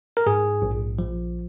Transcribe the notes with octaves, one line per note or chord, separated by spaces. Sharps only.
A#4
G#2 G#4
A#1
F3